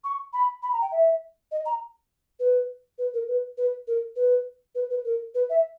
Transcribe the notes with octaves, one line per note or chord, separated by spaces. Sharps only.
C#6
B5
B5
A#5
G5
E5
D#5
A#5
B4
B4
A#4
B4
B4
A#4
B4
B4
B4
A#4
B4
E5